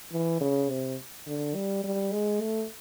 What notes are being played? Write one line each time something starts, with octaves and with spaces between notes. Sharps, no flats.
E3
C#3
C3
D3
G3
G3
G#3
A3